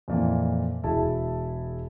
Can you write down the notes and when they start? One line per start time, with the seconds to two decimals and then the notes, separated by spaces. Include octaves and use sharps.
0.08 F2 A#2 E3
0.83 E1 E4 G#4 A5